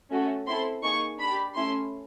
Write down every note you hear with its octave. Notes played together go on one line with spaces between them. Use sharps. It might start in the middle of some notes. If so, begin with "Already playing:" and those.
A3 C#4 F#4 A4
C4 E4 A4 C6
A#3 D#4 G#4 C#6
D4 B5
G4
A3 C#4 E4 C6